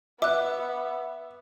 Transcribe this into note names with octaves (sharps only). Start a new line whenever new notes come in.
B3 E5 D6 F#6